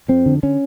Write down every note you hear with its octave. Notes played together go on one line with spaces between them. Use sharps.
F2 C4
D3
D3 C#4